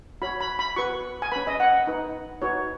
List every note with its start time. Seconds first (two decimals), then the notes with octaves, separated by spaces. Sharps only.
0.22 F#4 C#5 B5
0.41 B5
0.59 B5
0.76 F#4 B4 C#6
1.22 G#5
1.32 C#4 B4 B5
1.47 D#5
1.60 F#5
1.87 D#4 B4
2.42 D#4 F#4 B4 C#5